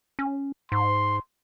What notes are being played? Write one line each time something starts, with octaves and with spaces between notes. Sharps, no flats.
C#4
G#2 C6